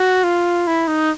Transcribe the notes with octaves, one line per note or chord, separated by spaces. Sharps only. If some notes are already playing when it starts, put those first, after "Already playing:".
Already playing: F#4
F4
E4
D#4